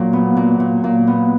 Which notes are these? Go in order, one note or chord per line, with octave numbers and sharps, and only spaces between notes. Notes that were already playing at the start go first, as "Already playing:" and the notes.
Already playing: A#2 F#3
B3
A#2
A#2
A#2
B3